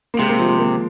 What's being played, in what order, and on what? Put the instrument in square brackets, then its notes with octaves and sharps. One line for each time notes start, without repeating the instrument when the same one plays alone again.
[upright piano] A#3
[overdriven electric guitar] C3 [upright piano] G#3
[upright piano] A#3
F3
G#3
A#3